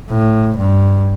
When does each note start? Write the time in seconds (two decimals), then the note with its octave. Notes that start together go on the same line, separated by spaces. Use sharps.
0.11 A2
0.58 G2